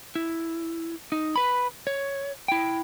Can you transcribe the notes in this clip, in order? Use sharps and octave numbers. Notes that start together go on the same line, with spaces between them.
E4
D#4
B4 B5
C#5
E4 G5